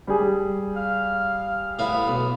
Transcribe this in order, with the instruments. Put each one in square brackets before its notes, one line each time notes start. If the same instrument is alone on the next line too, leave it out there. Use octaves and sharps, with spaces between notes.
[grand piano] G3 G#4
[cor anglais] F5
[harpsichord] A2 E4 F5 [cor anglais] B3
[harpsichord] B1